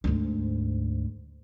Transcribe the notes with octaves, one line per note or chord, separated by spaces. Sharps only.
D2 G#2